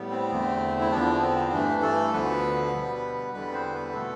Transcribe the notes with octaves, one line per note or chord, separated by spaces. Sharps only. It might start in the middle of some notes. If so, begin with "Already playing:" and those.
Already playing: A2 G3 B3
C4
E2 D3 A3
E4
E2 D3 F3 B3 D4
C4
G2 E3 A3 D4
A3 A4
D2 D3 F3 B3 B4
B2 G3 B3
E2 D3 G3 B3 B4
C4 C5
B3 B4
B2 A3 B3 A4